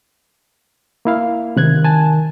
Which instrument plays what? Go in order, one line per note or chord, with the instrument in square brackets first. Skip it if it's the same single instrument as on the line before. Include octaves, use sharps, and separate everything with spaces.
[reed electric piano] A#3 E4 F5
[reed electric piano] C3 F#6 G#6 [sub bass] D#3
[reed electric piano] G#5 A5